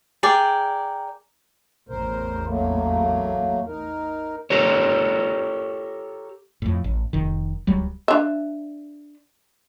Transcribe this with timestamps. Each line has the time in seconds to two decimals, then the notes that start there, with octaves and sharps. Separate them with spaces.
0.23 G#4 A#4 D5 G5
1.89 A1 E2 A#4 C5
2.47 F#3 A3 A#3
3.67 D#4 A#4
4.50 G4 A4 A#4 C#5
6.62 F2 A2
6.84 A1
7.13 F1 D#3
7.67 D1 C#2 F#3 G3
8.08 D4 E5